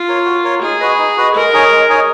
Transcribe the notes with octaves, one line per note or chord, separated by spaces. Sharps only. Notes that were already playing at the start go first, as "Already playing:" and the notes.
Already playing: F4
A#4 C#5
F#4
A#4 C#5
D#4 G#4
F#4 B4 D#5
D#4
F#4 B4 D#5
G#3 A#4
D#4 G#4 C#5 G#5
G#3
D#4 G#4 C#5 G#5